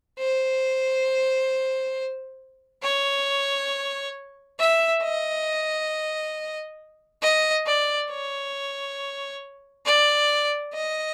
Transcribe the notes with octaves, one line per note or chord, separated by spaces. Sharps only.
C5
C#5
E5
D#5
D#5
D5
C#5
D5
D#5